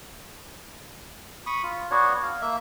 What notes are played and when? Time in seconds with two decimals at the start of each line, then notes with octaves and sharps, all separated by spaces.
1.46 B5 C#6 D#6
1.63 F4
1.91 B3 D4 F#4 C#5
2.23 F5
2.41 A#3 E5